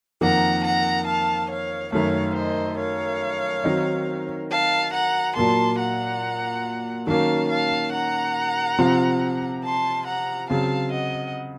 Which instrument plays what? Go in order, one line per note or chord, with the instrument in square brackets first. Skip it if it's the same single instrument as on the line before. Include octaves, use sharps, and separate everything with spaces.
[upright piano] F2 D#3 A#3 [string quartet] F#5 A#5
[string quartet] F#5 A#5
F5 A5
C#5 F5
[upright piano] F#2 D#3 A3 [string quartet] C#5 F5
[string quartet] C5 D#5
C#5 F5
[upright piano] D#3 F#3 C4 D#4
[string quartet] F5 A5
F#5 A#5
[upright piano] A#2 F#3 A#3 [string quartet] A5 C6
[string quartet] F#5 A#5
[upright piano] D#3 F#3 A#3 C#4 [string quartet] F5 A5
[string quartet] F5 A5
F#5 A#5
[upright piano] C3 F3 C4 F4
[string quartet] A5 C6
F#5 A#5
[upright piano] C#3 F#3 C4 [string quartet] F5 A5
[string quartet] D#5 F#5